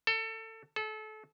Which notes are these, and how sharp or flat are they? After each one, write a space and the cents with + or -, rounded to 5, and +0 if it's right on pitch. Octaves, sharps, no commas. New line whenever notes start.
A4 +25
A4 -30